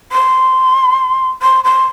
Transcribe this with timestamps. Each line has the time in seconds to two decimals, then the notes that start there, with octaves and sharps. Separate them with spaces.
0.12 C6
1.42 C6
1.64 C6